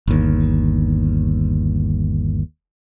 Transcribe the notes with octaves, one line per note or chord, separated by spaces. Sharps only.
G1 D#2